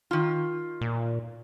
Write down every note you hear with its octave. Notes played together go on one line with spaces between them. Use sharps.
D#3 F4
A#2